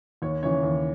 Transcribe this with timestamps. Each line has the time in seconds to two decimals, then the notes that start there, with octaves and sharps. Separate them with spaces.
0.22 D#2 C#5
0.43 C#3 E3 C#5
0.63 D#2